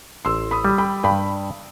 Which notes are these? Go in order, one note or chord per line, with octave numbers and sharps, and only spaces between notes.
A1 C6 E6
B5 D#6
G3
G5 B5
G2 G5 B5